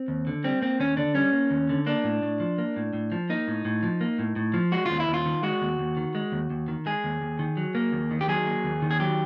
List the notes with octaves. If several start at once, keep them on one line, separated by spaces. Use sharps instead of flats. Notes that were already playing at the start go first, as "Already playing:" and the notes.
Already playing: C4
D#2
D3
G3 C4
A#3 C4
D#2 C#4
D3 D4
G3 C#4
A#3
D#2
D3
A#3 D4
A2
A2
F3
A#3
A2
A2
F3
A#3 D#4
A2
A2
F3
A#3
A2
A2
F3
G#3 F#4
D#2 F4
E4
D#2
F4
D#3
G#3 F#4
D#2
D#2
D#3
G#3
D#2
D#2
D#3
G#3 G#4
D#2
D#2
D#3
F#3
A#3
D#2
D#3
G4
F#3 G#4
A#3
D#2
D#3
G#4
F#3 G4